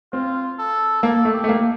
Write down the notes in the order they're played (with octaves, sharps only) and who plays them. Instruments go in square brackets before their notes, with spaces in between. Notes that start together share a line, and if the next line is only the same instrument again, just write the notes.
[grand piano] C4 [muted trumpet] F4
[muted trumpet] A4
[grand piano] A#3 [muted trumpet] A4
[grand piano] A3
[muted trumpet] G4
[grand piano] A3
A#3